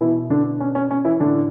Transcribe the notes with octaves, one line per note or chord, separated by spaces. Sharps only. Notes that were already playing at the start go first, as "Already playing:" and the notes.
B2 E3 E4
D3 D4
C#4
C#4
C#4
E3 E4
A2 D3 E3 D4